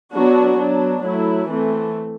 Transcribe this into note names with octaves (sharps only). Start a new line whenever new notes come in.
F#3 B3 D4 F#4
F#3 B3 D4
F#3 A3 E4
E3 A3 C4